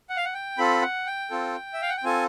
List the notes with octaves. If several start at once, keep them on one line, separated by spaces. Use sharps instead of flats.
F#5
F5
F#5
G5
C4 F4 A4 B5
F#5
G5
C4 F4 A4
E5
F5
F#5
G5
C4 F4 A4 G#5